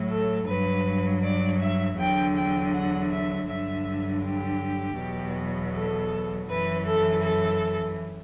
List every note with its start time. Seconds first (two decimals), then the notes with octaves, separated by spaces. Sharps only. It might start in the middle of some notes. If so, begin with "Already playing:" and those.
Already playing: A2 F#3
0.10 A4
0.47 G2 F#3 B4
1.22 D5
1.60 E5
1.97 E2 D3 F#3 G5
2.35 G5
2.72 F#5
3.10 E5
3.47 G2 D3 F#3 E5
4.23 G4
4.98 E2 B2 F#3
5.73 A4
6.48 F#2 E3 B4
6.85 A4
7.23 A4